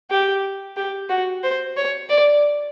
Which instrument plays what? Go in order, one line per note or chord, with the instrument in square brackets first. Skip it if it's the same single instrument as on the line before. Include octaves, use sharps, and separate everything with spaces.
[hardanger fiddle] G4
G4
F#4
C5
C#5
D5